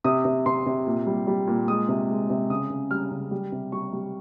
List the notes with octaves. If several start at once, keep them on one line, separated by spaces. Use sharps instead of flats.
C3 D#6
C3
C3 C6
C3
A#2
G3
G3
A#2
G#3 D#6
C3
G#3
C3
C#3 D#6
C#3
G3 F6
C#3
G3
C3
G3 C#6
G3